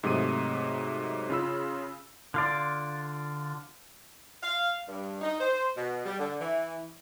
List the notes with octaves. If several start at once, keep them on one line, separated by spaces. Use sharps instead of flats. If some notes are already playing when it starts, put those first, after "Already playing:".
G#2 C3 F#3 A3 D#6 D#7
C#3 F4 B5 E6
D3 F4 D5
F5
G2
D#4
C5
B2
G3
D3
E3